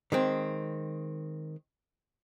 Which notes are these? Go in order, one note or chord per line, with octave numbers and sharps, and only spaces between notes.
D#3 G#3 C4